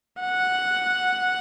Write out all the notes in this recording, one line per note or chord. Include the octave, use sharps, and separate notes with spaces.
F#5